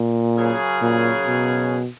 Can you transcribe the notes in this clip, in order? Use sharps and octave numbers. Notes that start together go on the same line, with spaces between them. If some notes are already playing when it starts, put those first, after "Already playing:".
Already playing: A#2
F#2 C#3 F#3 C#4 G#4
A#2
B2